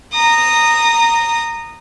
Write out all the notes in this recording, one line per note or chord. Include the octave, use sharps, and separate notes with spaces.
A#5 D#6